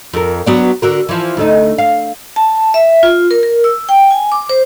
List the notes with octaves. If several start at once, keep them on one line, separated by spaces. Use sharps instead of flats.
F2 A#4
F#3 B3 D4
D3 F#4 A#4
E3 F3
D2 A3 D#4
F5
A5
E5
F4
A#4
A#4
E6
G5
G#5
D6
C5